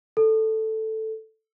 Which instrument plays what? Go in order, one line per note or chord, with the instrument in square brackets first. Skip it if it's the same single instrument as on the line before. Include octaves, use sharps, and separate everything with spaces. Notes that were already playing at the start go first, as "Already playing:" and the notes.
[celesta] A4